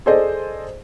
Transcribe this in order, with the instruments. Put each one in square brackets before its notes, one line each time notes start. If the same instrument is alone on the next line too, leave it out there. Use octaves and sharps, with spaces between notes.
[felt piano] G#4 A4 C5 D5 D#5